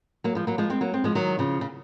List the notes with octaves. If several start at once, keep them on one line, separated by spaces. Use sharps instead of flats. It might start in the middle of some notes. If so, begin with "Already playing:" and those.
F#3 A#3
F3 G#3
F#3 A#3
F3 G#3
G#3 C4
F#3 A#3
G#3 C4
F3 G#3
D#3 F#3
C#3 F3
C#3